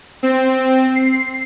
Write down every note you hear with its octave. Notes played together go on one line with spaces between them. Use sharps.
C4
C7